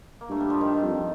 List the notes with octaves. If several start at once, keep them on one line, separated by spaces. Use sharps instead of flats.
A#3
G2 A3
G3
F3
D#3
F2